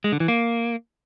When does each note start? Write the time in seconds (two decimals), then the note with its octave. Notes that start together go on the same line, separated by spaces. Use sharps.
0.04 G#3
0.12 D3
0.20 E3
0.28 A#3